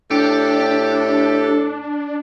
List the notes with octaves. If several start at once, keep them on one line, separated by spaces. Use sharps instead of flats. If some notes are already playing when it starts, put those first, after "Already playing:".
A2 D4 G4 A4 G5